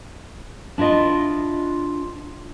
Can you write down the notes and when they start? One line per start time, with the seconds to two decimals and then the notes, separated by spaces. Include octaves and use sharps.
0.78 D4 E4 F4 D#5